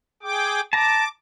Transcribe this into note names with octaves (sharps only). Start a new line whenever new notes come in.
G#4 G5 D6
A5 A#5 D6